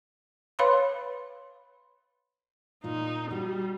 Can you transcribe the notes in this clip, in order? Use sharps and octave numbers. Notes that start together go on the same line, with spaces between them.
B4 C#5 F5 B5 C6
A#2 D#4 F4
G3 F#4